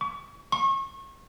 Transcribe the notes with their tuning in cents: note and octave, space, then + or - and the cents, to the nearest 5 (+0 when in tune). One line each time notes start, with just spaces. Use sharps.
C#6 +40
C#6 -35